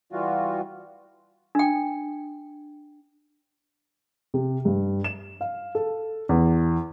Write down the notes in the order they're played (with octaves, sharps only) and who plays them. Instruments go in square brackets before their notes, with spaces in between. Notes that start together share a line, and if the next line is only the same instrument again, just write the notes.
[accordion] E3 G3 F4 F#4
[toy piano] D4 G5
[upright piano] C3
G2
E7
F5
A4
E2